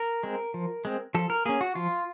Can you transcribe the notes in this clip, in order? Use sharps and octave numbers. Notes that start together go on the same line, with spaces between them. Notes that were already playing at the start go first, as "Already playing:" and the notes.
Already playing: A#4
G#3 C4
F3
G#3 C4
F3 A4
A#4
A#3 C#4 G#4
F#4
F3 F4